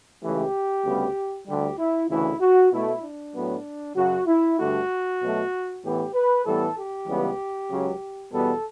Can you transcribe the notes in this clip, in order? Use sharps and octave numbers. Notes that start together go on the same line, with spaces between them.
C#2 C#3 E3 A3 G4
D2 C#3 G3 B3
D2 D3 G3 G4
E4
D2 C#3 E3 A3 E4
F#4
B2 A3 E4
D4
A2 F#3 B3
F#2 C#3 F#3 F#4
E4
G2 D3 A3 F#4
B2 F#3 A3
A2 E3 B3 G4
B4
A2 E3 G3 B3 A4
G4
C#2 C#3 E3 G3 B3
C#2 C#3 F#3
E2 B2 G3 B3 A4